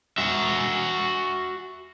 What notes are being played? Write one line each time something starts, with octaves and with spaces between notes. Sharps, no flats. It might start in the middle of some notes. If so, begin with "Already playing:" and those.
F#4 E5